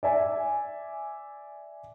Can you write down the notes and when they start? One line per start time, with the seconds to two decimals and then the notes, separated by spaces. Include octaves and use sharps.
0.03 D5 E5 G#5